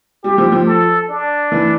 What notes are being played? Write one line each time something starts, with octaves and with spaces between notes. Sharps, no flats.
G3 G4
F3
F3
A4
D4
E3